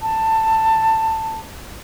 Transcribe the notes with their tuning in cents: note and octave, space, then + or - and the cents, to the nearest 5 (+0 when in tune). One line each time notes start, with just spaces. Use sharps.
A5 +15